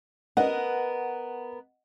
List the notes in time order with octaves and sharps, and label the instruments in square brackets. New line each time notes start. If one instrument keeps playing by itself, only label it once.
[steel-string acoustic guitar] B3 A#4 [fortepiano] D#5 F#5